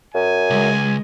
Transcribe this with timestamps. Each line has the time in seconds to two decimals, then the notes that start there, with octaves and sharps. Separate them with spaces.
0.15 F#2 G#5
0.50 C#2 G#3